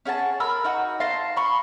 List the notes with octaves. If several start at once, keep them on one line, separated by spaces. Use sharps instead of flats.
C#4 G#4 F#5 A5
A#4 B5 E6 F6
D#4 F#4 F#5
F5 A5 A#5 C6
B5 C#6